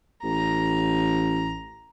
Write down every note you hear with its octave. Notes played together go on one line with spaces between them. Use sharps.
A1 A#5